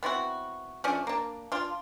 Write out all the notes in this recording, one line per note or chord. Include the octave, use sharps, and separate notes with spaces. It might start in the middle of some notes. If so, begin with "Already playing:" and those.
B3 C4 E4 F#4
F3 A3 C#4 D4
A#3 D4
D4 F4